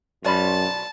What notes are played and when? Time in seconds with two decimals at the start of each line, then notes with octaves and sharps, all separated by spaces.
0.24 B1 F#2 D5 A5 B5